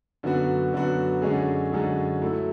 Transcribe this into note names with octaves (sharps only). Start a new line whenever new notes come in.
F#2 D3 F#3 B3 F#4
F#2 D3 F#3 B3 F#4
F#2 D3 G#3 C#4 G#4
F#2 D3 G#3 C#4 G#4
F#3 A3 E4 A4